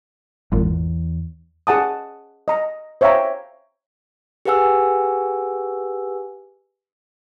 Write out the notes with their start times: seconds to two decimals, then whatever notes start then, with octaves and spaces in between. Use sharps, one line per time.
0.52 G#1 E2 A#2
1.67 G#4 F#5 A5 D#6
2.48 D#5 A#5
3.01 C5 C#5 E5 F5 G5 A#5
4.45 G4 G#4 B4 F#5 G#5 E6